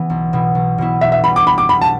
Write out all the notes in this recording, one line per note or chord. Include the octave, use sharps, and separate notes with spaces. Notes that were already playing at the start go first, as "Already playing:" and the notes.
Already playing: E3 B3
B1
B2 B3 E4
B1
B2 B3 E4
B1 E5
E5
B2 G3 B5
D6
B1 B5
D6
B2 G3 B5
A5